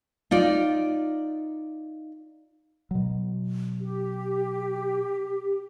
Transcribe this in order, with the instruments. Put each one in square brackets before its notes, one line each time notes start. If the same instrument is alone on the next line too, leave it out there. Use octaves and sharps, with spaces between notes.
[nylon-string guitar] D#4 F4 D5
[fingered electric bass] B2 F#3
[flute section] G4